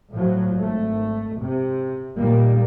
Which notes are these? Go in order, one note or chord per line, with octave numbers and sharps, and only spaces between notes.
A2 F3 F#3
G#1 A3
C3
A#2 D#3 G3 A#3